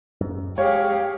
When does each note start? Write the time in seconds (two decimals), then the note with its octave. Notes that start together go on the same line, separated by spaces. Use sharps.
0.21 F#2
0.58 G#3 G4 G#4 C#5 F5